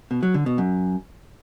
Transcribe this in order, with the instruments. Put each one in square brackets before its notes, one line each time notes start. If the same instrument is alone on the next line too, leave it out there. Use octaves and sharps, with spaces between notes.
[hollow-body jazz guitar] B2
F#3
D3
B2
F#2